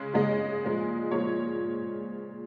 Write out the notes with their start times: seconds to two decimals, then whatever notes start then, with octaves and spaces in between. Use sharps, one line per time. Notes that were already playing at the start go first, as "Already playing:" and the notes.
Already playing: C#3 G#3
0.14 C#3 G#3 D#5
0.63 A#2 F3 G#3
1.11 A#2 F3 G#3 C#5